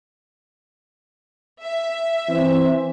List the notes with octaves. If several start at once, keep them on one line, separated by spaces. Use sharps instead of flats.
E5
E3 C4